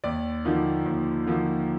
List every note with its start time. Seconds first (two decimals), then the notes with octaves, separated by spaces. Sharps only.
0.04 D#2 D5
0.45 D3 F3 A#3 D#4
0.86 D#2
1.27 D3 F3 A#3 D#4